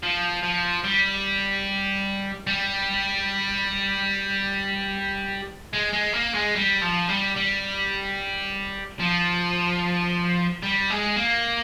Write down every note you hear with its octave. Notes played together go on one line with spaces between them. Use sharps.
F3
F3
G3
G3
G#3
G#3
A#3
G#3
G3
F3
G3
G3
F3
G3
G#3
A#3